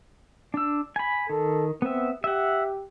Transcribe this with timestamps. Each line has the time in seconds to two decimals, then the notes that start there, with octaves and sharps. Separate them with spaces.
0.54 D4 E6
0.96 G#5 B5
1.30 D#3 A4
1.82 B3 C4 E5
2.24 G4 E5 F#5